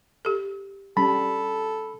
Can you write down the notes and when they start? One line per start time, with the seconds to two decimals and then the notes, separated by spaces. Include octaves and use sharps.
0.25 G4 A4
0.97 G3 C#4 A4 B5